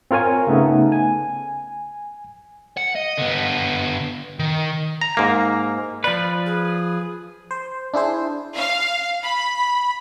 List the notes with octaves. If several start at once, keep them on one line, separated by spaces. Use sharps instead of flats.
C4 F4 A#4 C#5 G#5
C#3 A3 B3 D#4
G#5
F#5
D#5
D3 B3
D#3
A#5
G#2 A#3
F3 B4 D5
G#4
C5
D4 E4 G#4 C5
F5
B5